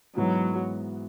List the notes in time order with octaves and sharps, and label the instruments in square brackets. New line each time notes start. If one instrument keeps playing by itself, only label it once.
[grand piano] G#2 E3 G#3 B3 F#4 [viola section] F#3